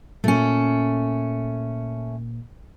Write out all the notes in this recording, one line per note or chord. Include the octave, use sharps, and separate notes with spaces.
A#2 A3 A#3 C#4